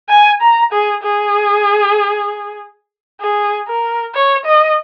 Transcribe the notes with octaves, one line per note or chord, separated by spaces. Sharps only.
G#5
A#5
G#4
G#4
G#4
A#4
C#5
D#5